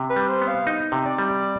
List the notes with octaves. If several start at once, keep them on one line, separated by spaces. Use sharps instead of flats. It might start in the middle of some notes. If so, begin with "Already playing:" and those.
Already playing: C3
B4
G3
C5
B3
F5
D#4
C3
D5
G3